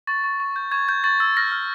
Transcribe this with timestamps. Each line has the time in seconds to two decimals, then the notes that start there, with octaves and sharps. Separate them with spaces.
0.07 C#6 A6
0.24 C#6
0.40 C#6
0.56 G6
0.72 C#6 G#6
0.89 G6
1.04 C#6 A6
1.20 E6 A6
1.37 F6 A#6
1.52 F6